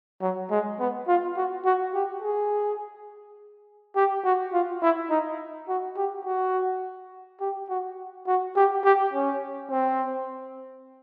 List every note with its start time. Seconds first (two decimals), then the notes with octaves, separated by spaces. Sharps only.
0.21 F#3
0.50 G#3
0.79 B3
1.07 F4
1.36 F#4
1.65 F#4
1.94 G4
2.22 G#4
3.96 G4
4.24 F#4
4.53 F4
4.82 E4
5.10 D#4
5.68 F#4
5.97 G4
6.25 F#4
7.40 G4
7.69 F#4
8.27 F#4
8.56 G4
8.84 G4
9.14 C#4
9.70 C4